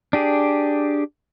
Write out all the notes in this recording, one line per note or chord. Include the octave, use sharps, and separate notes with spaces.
D4 G4 G#4